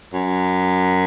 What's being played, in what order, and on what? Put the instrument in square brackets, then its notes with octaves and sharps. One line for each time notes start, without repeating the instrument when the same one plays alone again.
[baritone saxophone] F#2